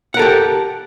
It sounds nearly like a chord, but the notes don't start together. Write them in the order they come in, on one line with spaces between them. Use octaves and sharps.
F#5 A#4 A4 G4